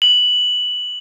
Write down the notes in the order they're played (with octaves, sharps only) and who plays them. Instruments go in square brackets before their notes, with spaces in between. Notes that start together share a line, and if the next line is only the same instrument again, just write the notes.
[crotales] F#7